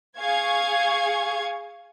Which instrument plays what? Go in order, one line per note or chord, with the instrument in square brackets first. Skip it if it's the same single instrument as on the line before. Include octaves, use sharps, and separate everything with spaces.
[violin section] G#4 F5 C#6 G#6